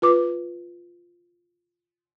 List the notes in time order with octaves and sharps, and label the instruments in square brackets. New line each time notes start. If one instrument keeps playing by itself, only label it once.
[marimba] F4 B4 D6